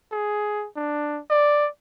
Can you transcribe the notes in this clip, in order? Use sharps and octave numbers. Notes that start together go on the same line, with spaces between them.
G#4
D4
D5